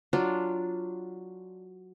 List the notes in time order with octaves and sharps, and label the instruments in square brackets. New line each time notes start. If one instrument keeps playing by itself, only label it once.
[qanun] F#3 D4 F4